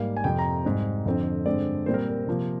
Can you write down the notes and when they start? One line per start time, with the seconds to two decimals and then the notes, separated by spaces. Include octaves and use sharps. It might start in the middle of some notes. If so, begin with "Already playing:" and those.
Already playing: G#2 G3 A#3 F5
0.17 G#5
0.24 F2 C3 F3 G5
0.38 A#5
0.65 G#2 G3 C4
1.06 F2 D3 F3 C4
1.46 G2 D3 G#3 C4 D5
1.86 A#2 G3 C4 C5
1.94 A#4
2.09 A#4
2.27 C3 F3 A#3